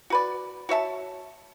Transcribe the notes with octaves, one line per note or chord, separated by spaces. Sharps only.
F#4 B4 D5
F#4 C#5 E5 A5